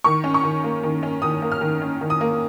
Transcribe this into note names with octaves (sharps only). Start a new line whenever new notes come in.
D#3 C#6
C#4
C#6
D#3
A#3
D#3
C#4
D#3 D#6
A#3
F6
D#3
C#4
D#3
D#6
A#3